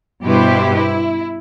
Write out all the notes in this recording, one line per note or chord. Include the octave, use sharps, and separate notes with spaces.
G2 B2 E4 G4 B4 C5
E4